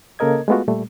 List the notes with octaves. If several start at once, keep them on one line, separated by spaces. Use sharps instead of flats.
C#3 A#3 A4 A#4 D#5 G#6
G#3 A3 B3 F4 F#4
A#2 G3 A3